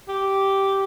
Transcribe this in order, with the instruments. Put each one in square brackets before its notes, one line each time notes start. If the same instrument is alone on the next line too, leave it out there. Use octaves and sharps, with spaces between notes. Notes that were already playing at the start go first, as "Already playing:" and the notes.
[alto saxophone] G4